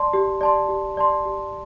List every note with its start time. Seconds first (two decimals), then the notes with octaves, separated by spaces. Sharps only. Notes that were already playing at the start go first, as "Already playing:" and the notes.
Already playing: D5 A5 C6
0.13 G4
0.41 D5 A5 C6
0.68 G4
0.97 D5 A5 C6
1.25 G4